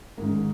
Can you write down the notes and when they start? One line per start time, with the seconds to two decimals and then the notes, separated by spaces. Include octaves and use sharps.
0.17 G#2 D#3 A#4